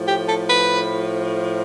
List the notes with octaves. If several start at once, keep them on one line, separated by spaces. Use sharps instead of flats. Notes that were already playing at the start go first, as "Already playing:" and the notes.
Already playing: A2 F3
G4
A4
B4